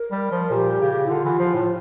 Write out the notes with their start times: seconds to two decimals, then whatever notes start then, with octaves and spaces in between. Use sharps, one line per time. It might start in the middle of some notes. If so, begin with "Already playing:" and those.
Already playing: A#4
0.11 G3
0.31 F3
0.51 A#2 G4
0.81 C#3
1.06 E4
1.10 D3 F4
1.25 E3
1.39 F3
1.54 A2